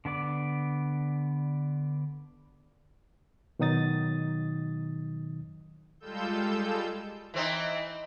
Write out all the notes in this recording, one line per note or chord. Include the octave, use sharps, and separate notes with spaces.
D3 B3 D5 D6
B2 D#3 F#3 D#4 D#6 A6
G3 G#3 F4 A4 E6 G6
E3 C4 D#4